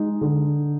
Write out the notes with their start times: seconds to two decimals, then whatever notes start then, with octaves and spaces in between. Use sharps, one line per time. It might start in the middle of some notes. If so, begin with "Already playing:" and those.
Already playing: G#3 D#4
0.21 D3